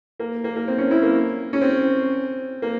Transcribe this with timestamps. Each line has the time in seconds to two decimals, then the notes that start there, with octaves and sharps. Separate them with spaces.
0.20 A#3
0.44 A#3
0.56 A#3
0.68 C4
0.78 C#4
0.91 E4
1.03 A#3
1.53 C#4
1.61 C4
2.62 A#3